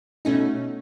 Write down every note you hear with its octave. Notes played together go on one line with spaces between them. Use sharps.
B2 A3 C#4 D#4